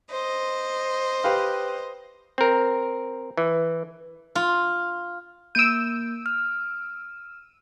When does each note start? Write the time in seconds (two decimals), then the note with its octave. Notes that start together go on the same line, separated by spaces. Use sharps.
0.10 C5 D#5
1.24 G4 B4 F5
2.38 C4 A#4
3.37 E3
4.35 F4
5.55 A#3 E6 G6 D7 D#7
6.26 F6